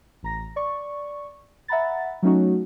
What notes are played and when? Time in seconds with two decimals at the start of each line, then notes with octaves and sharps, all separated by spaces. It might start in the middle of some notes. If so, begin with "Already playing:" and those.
0.23 A1 A#5 A#6
0.56 D5 C#6
1.68 E5 F#5 A#5 B5 A6
2.23 F#3 A3 C#4 D#4 F#4